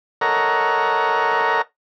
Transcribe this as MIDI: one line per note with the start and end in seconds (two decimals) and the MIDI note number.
0.21 1.62 69
0.21 1.62 70
0.21 1.62 73
0.21 1.62 75
0.21 1.62 78
0.21 1.62 82